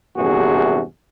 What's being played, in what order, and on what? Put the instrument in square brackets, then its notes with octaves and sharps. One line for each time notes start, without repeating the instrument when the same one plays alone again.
[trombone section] A#1 E2 G2 C3 F#4 G#4